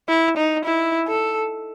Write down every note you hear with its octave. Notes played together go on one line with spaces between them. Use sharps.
E4
D#4
E4
A4